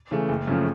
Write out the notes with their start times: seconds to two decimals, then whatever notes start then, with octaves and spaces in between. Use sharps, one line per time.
0.11 C#3 E3 A3
0.29 F#1
0.47 F#2 C#3 F3 A3